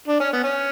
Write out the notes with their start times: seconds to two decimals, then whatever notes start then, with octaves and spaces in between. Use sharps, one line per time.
0.08 D4
0.20 C#4
0.33 B3
0.44 C#4